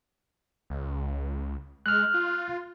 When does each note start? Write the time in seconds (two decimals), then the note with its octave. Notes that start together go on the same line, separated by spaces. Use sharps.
0.70 C#2
1.86 G#3 F6 F#6
2.14 F4